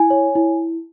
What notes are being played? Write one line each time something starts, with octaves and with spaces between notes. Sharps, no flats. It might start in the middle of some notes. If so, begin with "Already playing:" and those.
Already playing: E4 G#5
C#5
E4